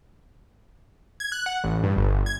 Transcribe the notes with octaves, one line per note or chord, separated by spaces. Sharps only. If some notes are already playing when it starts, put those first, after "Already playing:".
G#6
F#6
F#5
A1
G2
G1
G#6